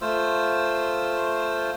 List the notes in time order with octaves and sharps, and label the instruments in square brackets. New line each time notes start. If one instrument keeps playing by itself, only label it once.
[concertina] A3 F4 C5 E6